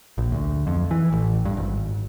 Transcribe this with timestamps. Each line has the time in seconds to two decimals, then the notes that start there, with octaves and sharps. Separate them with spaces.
0.18 A#1
0.32 D2
0.67 F2
0.91 E3
1.12 A1
1.45 G2
1.57 G#1